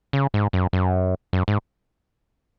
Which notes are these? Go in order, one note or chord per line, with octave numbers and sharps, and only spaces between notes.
C#3
G#2
F#2
F#2
F#2
G#2